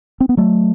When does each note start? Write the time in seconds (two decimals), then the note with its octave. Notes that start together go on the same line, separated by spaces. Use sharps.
0.20 C4
0.29 B3
0.37 F#3 A3